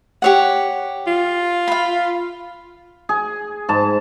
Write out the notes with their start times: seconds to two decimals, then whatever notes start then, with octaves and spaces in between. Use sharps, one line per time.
0.22 G4 C#5 F#5
1.07 F4
1.67 F5 B5
3.09 G#4
3.69 G#2 A5